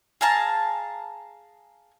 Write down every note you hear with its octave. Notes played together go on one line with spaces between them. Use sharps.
G#4 F5 A5 A#5